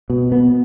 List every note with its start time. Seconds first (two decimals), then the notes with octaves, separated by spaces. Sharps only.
0.10 B2
0.32 B3